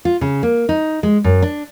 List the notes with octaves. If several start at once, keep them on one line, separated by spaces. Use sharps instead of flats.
F4
C#3
A#3
D#4
G#3
F#2
D4